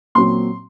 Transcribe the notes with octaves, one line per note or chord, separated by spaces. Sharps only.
A#2 F#3 C4 C6